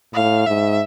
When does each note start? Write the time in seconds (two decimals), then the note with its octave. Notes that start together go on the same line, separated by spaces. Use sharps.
0.14 A2 F5
0.46 G#2 E5